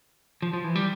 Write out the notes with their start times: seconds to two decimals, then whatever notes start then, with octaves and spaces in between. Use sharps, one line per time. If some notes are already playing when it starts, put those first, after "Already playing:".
0.42 F3
0.53 F3
0.64 E3
0.75 G3